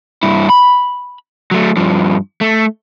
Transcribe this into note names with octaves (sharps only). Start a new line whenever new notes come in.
G2 E4
B5
F#3 A3
G2 F3
A3